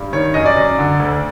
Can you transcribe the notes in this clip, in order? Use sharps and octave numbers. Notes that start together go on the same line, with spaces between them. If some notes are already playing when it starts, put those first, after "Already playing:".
Already playing: G2
D#3 C#5
F#2 D#5
D5
F#2
D3
D2